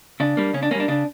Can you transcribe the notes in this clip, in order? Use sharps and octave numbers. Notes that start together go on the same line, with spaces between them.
C#3 D4
G3 A#3
C#3 C#4
D4
G3 A#3 C#4 D4
C#3 D4